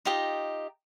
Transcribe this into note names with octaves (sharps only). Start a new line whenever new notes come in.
D#4 F4 G4 D#5